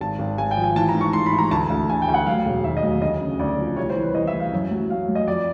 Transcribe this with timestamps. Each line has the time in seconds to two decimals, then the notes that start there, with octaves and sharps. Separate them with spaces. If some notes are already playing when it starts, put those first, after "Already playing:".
0.01 G#1 A5
0.19 G#1
0.38 G#1 G#5
0.51 G5
0.57 F3
0.64 G#5
0.76 E3 A5
0.89 A#5
0.95 G#2
1.01 C#6
1.13 G#2 C6
1.26 B5
1.32 E3
1.39 A#5
1.51 D2 A5
1.70 D2
1.89 D2 G#5
2.02 G5
2.08 D2
2.14 F#5
2.27 F#3 F5
2.46 E1
2.64 D#2 E5
2.77 D#5
2.83 F#3
3.02 D2 D#5
3.21 C#3
3.39 D2 D5
3.58 F3
3.76 C2 C#5
3.90 C5
3.96 E3
4.03 B4
4.15 E3 D#5
4.27 E5
4.34 E3
4.40 F5
4.52 F#2
4.71 F#3
4.90 F#3 F5
5.09 F#3
5.15 D#5
5.27 F2 D5